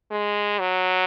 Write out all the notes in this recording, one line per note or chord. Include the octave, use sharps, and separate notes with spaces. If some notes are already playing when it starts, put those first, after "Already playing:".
G#3
F#3